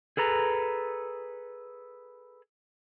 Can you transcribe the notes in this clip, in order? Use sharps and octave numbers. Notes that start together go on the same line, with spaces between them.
G#4 A4 B4 A#5